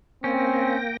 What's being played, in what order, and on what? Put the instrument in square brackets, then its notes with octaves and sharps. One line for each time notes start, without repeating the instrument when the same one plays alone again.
[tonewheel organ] A#3 G5 A#6 [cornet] C4 [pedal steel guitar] C#4